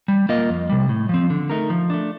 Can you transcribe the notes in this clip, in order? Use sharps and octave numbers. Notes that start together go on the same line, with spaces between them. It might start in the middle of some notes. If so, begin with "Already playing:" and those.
G3
A#3 F4 A#4 D#5
F2
C3 G3
A2
F3 C4
D3
A3 D#4 A#4
F3
A3 D4